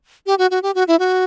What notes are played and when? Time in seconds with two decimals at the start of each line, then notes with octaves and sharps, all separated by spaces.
0.26 G4
0.38 F#4
0.51 F#4
0.63 G4
0.75 F#4
0.88 E4
0.99 F#4